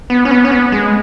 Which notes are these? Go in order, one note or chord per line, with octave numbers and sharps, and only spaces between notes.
B3
C#4
B3
C#4
B3
G#3